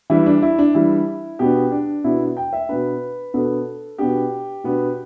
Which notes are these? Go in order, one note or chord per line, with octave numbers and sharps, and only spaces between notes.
E3 G3 D4 E4
D4
E4
D4
E3 G3 D4 E4
B2 B3 D4 G4
D4
B2 B3 D4 E4
G5
E5
B2 B3 D4 B4
B2 B3 D4 A4
B2 B3 D4 G4
B2 B3 D4